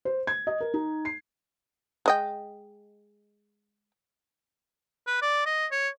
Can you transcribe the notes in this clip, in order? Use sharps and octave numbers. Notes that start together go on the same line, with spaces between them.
C5
G#6
D#5
A#4
D#4
C7
G#3 D#5 G5
B4
D5
D#5
C#5